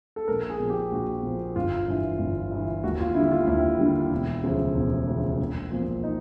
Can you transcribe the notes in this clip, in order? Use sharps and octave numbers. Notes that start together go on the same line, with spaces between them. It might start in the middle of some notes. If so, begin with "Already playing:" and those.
A4
A#1 A#4
G#4
A#2 F3
G4
A#1 F#4
A#2 F3
G1 F4
G2 E3
G1
G2 E3
D#2 F#4
F4
D3 G3 E4
F4
D#2 E4
D3 G3
E1
D2 C#3 F3
E1
D2 C#3 F3
A#1
A#2 F3
D#4